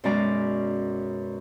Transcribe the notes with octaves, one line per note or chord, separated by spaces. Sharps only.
F#2 B2 G#3 C#4 D5 A#5